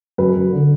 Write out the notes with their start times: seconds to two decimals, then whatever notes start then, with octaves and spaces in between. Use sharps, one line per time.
0.18 F#2 B4
0.35 F#2
0.53 D3